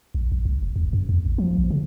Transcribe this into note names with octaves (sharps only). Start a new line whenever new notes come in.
A#1
A#1
C2
F1
D#2
F#2
E2
A1
F3
A#1
C#3